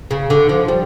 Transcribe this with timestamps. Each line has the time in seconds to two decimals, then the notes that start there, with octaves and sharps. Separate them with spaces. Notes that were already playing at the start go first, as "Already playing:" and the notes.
0.11 C#3
0.30 D3
0.49 F3
0.68 G3